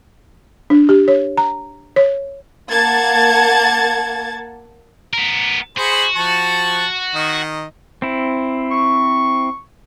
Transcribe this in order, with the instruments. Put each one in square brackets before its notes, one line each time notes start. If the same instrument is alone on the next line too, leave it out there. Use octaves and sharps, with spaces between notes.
[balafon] D4
G4
C#5
A#5
C#5
[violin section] A#3 F#5 A5 G#6 A6
[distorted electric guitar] B3 A#4
[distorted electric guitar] F#4 [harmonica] G#4 C5 B5
[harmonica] F3 A5 C#6
D#3 D#5
[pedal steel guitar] C4 E4
[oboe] C#6